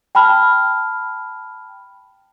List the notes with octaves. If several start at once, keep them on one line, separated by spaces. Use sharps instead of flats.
G5 A5 B5 F6